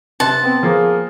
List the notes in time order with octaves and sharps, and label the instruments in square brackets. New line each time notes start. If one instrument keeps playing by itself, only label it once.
[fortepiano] C3 C6 F#6 [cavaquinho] A5
[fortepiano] B3 [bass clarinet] C4
[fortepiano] F3 A#3 [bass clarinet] G#4